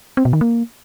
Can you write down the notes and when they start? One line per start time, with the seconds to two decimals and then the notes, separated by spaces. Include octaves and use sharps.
0.17 C4
0.25 B2
0.33 D#3
0.41 A#3